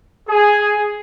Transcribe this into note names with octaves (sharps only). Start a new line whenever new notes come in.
G#4